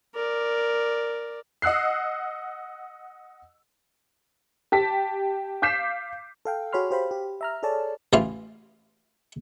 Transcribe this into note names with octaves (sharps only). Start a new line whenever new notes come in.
A#4 D5
D#5 F#5 E6 F#6 C7
G4 A5 B6
F5 D6 G6 B6 C7 E7
A4 F5 G5
F#4 G#4 C#5 B5 C6 F6
G4 C5 F5 B5
G4
E5 A#5 F6
G#4 A4 C#5 D5 A5
A1 E3 F4 F5